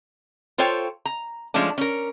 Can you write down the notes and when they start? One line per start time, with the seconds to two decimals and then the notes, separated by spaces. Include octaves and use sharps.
0.58 F4 A4 C5 C#5 G5
1.05 A#5
1.54 F3 G#3 A3 C#4 D4
1.78 C#4 A#4